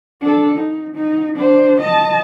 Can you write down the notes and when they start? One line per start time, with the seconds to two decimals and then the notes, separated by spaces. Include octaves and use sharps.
0.21 D4 A4
0.57 D#4
0.94 D#4
1.36 D4 C5
1.80 D#5 A5